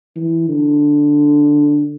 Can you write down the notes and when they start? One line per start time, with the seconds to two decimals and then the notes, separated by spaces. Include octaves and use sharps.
0.16 E3
0.49 D3